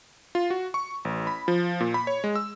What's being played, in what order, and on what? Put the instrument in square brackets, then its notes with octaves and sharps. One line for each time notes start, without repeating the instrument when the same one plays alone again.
[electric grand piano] F4
F#4
C#6
A1
B5
F3
A#2
B5
C#5
G#3
E6